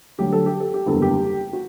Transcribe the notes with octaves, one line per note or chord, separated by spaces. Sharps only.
D2 D3 F#3 G4
A4
G4
A4
G4
F#1 E2 D3 G3 A4
G4
F#4